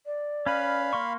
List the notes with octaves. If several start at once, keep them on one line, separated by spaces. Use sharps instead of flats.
D5
C#4 B4 F5 B5
A#3 C6 C#6